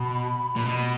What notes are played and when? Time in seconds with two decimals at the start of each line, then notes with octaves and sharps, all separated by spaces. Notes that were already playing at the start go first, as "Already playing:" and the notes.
Already playing: B2 B5
0.56 A#2
0.66 B2